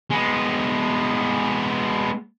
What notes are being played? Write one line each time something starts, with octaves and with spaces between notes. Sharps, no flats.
G#3 B3